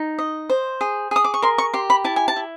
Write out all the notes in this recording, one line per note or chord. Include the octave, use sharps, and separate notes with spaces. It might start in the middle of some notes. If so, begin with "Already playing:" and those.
Already playing: D#4
D#5
C5
G#4
G#4 D#6
D6
C#6
A#4 C6
C#6
G4 C6
B5
E4 A5
G#5
A5
E4